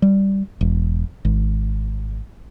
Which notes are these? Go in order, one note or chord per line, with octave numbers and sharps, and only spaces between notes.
G3
E1
G#1